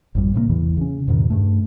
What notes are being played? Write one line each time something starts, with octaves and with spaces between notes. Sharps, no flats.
G#1 F2 G3
A2 C3 A3 A#3
E2 E3
C#3 C#4
E2 G#2 B2 D#3
G2 A3